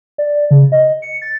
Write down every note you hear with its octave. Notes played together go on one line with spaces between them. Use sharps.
D5
C#3
D#5
C#7
A6